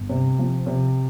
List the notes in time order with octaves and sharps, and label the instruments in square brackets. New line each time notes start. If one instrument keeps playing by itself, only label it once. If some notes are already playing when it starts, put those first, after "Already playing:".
Already playing: [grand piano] G1
C3
F3
C3